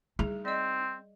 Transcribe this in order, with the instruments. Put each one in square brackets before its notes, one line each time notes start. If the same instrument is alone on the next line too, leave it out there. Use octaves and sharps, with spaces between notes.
[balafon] G3 G#4 [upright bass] D#4
[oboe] C4 [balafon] D5 D#5